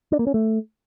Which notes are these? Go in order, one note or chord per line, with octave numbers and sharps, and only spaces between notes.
D4
A#3
C#4
A3